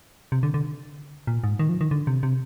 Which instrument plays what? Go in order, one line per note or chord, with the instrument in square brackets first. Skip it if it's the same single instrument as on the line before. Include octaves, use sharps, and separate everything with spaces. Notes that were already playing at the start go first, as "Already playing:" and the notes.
[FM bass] C3
D3
D3
A#2
G#2
D#3
F3
D#3
D3
C3
C3